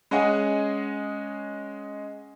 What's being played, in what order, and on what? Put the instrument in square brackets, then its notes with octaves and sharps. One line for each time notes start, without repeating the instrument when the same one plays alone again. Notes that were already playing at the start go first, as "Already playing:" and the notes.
[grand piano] G#3 C#4 G#4 D#5 F#5 G#5